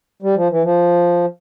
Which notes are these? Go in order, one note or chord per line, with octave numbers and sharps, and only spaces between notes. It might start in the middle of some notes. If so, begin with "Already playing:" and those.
G3
F3
E3
F3